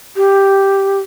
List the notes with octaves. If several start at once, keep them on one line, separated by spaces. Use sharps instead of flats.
G4